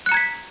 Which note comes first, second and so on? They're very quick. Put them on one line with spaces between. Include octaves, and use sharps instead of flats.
F#6 C#7 A#5 G#6 B6